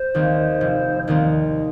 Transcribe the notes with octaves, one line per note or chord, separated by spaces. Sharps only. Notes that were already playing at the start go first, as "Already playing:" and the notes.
Already playing: C5
D#2 D#3 G3 C4
F1
D#2 D#3 G3 C4